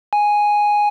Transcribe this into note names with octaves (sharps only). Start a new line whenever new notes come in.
G#5